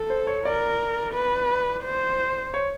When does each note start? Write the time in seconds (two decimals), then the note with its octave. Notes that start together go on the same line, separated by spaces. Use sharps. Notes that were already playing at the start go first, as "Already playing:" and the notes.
Already playing: A4
0.10 C5
0.27 C#5
0.45 A#4 D5
1.14 B4
1.83 C5
2.54 C#5